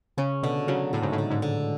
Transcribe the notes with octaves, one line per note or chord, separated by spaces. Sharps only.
C#3 C#4
B2 D3
C#3 F#3
A2 D3
G#2
A2
D3
G#2
D3